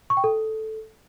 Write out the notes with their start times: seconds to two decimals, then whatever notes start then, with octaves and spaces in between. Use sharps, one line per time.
0.10 C#6
0.17 G5
0.24 A4